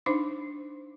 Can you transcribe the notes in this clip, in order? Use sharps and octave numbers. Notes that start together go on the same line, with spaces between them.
D4 D#4 C5 D6